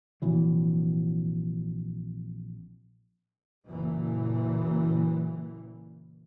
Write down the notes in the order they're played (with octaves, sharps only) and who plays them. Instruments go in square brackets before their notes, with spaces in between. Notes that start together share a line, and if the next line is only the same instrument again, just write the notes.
[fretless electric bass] A#1 C3 E3 F#3
[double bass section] F#1 A#2 E3